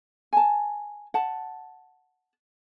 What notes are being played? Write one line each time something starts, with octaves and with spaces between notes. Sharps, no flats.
G#5 A5
F#5 A5